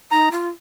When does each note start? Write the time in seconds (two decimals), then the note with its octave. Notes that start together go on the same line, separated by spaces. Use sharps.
0.11 D#4 A#5
0.31 F4